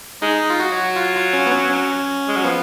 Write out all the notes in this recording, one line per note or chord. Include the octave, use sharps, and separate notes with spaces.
G#3 D#4
F4
F#4
F#3
F4
F4
C#4
B3
C#4
C#4
G#3
F#3
F3 B3